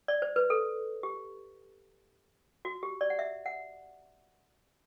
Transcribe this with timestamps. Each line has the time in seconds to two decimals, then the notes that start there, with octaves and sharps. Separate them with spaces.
0.08 D5
0.22 C5
0.36 B4
0.50 A4
1.03 G4
2.65 F#4
2.83 G4
3.01 D5
3.10 F#5
3.19 E5
3.46 F#5